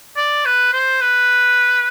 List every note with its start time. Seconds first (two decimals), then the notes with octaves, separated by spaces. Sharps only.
0.17 D5
0.46 B4
0.73 C5
1.01 B4